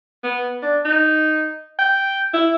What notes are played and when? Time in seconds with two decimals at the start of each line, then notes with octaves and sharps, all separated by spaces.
0.24 B3
0.62 D4
0.85 D#4
1.78 G5
2.33 E4